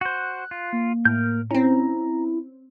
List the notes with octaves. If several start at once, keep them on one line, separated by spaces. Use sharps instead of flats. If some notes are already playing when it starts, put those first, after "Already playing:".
F#4 C5 F#6
F4
A#3
A2 A#4 F6 G6
C4 C#4 E4 A#5